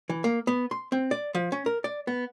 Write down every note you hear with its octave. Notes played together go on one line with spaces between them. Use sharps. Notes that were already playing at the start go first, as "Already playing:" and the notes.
E3
A#3
B3
C6
C4
D5
F3
C#4
A#4
D5
B3